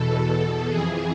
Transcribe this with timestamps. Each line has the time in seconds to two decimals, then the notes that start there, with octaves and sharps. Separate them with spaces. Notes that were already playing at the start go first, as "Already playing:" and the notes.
Already playing: E2 B2 A4
0.68 F2 E3 G#4